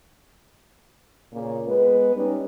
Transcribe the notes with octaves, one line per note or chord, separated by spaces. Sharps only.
A#2 C#3
G#3 B3 B4
G3 C#4 D#4